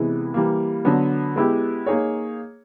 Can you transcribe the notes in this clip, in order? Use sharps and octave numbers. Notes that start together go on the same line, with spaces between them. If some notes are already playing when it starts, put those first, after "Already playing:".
Already playing: C3 E3 G#3 B3 E4
E3 G3 A#3
D3 F#3 B3
G#3 B3 E4 G4
A#3 D#4 G#4 C#5